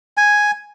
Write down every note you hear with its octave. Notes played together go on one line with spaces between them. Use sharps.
G#5